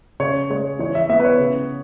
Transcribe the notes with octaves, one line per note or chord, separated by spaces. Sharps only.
C#3 C#5
G#3 C#5
E3 C#5
E5
B3 E5
B4
C#5
C#3